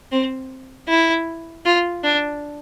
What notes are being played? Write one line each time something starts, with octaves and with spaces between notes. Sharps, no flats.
C4
E4
F4
D4